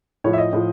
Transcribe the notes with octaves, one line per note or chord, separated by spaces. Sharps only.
A2 F3 C#5
E5
D#5
A2 F3